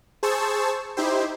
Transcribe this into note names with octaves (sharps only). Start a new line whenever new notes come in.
G#4 C5 A5 C#6 E6
D#4 E4 G4 C5